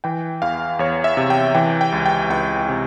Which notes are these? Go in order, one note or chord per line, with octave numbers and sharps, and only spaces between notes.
E3 G5
E2 F5
E2 C#5
E5
C3
G5
E3 G5
G5
C#2
G5
C#2 G5
C3